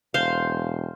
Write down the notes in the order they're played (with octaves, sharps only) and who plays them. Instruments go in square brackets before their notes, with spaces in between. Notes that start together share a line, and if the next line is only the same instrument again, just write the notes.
[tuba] E1 [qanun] C5 F5